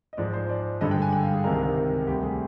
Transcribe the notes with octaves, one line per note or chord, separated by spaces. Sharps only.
D#5
G#2 F3 G#3 D5
C5
D5
G2 D3 G#3 D#5
G5
G#5
G5
F5
G#4
C2 C3 D#3 G#3 A#4
D2 C3 G3 G4
G#4